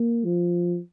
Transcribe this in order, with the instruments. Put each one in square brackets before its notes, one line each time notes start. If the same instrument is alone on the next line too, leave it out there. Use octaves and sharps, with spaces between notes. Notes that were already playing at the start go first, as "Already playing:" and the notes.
Already playing: [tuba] A#3
F3